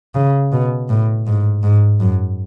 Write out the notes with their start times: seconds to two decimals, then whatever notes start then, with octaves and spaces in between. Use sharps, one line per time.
0.15 C#3
0.52 B2
0.89 A2
1.27 G#2
1.63 G#2
2.00 F#2